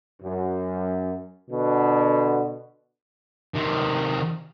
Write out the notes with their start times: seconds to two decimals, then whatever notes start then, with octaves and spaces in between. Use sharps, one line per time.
0.22 F#2
1.51 B2 D3
3.55 C3 D#3